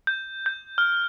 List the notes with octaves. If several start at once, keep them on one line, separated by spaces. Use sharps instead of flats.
G6
G6
F6